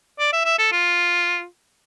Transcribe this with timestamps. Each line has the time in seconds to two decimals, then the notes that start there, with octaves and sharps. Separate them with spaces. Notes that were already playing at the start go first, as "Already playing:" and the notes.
0.19 D5
0.33 E5
0.45 E5
0.59 A4
0.72 F4